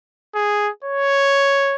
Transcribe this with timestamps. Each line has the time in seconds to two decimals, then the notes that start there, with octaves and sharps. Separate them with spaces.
0.35 G#4
0.84 C#5